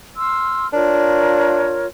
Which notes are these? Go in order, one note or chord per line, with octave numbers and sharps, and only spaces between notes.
C6 E6 F6
D4 F4 A#4 C#5